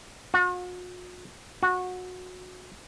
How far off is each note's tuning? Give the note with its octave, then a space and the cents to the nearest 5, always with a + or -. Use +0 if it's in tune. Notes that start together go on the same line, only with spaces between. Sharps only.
F#4 -45
F#4 -20